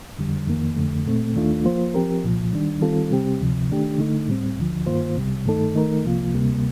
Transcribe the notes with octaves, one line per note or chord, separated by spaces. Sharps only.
F2 D3 G3
F2 D#3 A#3
F2 D3 A3
A#2 A3 C4
D#2 D#3 A3 D4 F4
F3 A#3 F4 C5
F3 C4 G4 A#4
C2 A#2 F3
D#3 G3 D4
D#3 G3 C4 F4 A4
C3 G3 C4 G4
D2 C3 F3
D#3 A3 D4 G4
D3 A3 D#4
A2 G3 C4
D2 D3 F3
G2 D#3 A#3 F4 C5
C2 C3 G3
G2 D#3 A3 D#4 A4
D#3 A3 D#4 A#4
C2 C3 F3 A#3 F4
D2 C3 G3 A#3